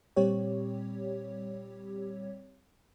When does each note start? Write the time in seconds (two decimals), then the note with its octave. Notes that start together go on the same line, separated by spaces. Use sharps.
0.16 A#2 G3 C4 G4 C#5